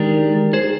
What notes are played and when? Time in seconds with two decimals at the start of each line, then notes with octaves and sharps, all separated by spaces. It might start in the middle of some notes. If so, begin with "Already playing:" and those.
Already playing: D#3 G#3 D4 G4 A#4
0.53 G#4 C5